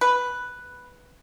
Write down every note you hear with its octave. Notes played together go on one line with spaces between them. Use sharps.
B4